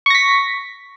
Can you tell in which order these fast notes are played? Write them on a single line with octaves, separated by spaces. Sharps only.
C#6 A#6 B6